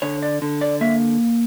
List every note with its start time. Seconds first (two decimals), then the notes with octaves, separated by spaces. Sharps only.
0.02 D3 C#5
0.23 D5
0.42 D3
0.61 D5
0.81 A#3 E5